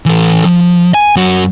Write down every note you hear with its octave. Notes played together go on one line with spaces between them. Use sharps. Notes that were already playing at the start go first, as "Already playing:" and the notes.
E3 A4
F3
G#5
F#2 F#4